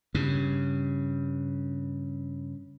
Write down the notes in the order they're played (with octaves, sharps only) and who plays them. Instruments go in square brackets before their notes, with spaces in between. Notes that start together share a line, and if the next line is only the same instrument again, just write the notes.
[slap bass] G2 C#3